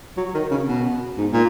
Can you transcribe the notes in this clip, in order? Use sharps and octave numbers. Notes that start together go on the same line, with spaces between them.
F#3
D#3
C#3
B2
G#2
A#2